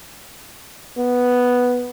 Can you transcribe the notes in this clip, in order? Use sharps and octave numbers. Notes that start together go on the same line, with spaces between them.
B3